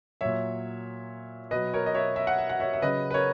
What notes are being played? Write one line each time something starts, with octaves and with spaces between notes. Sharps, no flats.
A#2 F#3 C#5 E5
B2 F#3 B4 D#5
A#4 C#5
D#5
C#5 E5
E5
F#5
E5
F#5
C#5 E5
E5
C#3 F#3 B4 D#5
B4
A#4 C#5